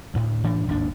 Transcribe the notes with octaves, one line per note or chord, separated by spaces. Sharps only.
D2 A2
A2 E3 D4
A1 D#2 G#2 D4